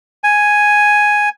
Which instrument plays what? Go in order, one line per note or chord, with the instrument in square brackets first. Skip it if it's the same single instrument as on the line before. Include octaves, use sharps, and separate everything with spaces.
[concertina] G#5